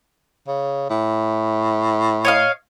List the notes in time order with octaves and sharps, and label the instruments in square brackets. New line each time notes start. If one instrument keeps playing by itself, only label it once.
[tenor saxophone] C#3
A2
[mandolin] C#5 D#5 F5